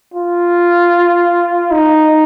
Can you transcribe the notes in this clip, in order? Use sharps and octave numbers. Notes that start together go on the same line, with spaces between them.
F4
D#4